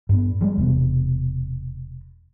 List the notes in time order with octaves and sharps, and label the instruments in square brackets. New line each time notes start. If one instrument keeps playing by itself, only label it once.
[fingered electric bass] G2 B3
F3 G3 G#3 A#3
E1 C3 B3